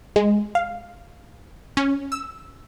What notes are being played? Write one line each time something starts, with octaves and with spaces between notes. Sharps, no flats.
G#3
F5
C#4
E6